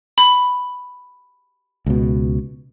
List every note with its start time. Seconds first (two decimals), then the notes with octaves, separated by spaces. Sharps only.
0.18 B5
1.86 C#2 B2